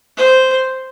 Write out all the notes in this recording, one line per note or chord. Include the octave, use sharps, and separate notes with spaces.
C5